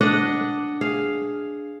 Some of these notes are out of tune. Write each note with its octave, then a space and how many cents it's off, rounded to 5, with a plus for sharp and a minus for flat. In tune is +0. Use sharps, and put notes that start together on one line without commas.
D4 +0 D#5 +0 F#5 +0
G#4 +0 F5 +0